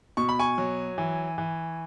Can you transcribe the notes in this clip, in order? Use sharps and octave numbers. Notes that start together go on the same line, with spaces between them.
B2 C#6
B5
G#5 C#6
F#3
E3
E3